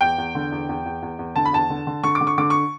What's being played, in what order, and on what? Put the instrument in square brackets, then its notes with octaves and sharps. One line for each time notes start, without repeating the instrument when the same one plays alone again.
[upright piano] E2 G5
E2
D3
E2
E2
E2
E2
E2
D3 A5
B5
E2 A5
D3
D3
D3 C#6
D6
D3
C#6
D3 D6
C#6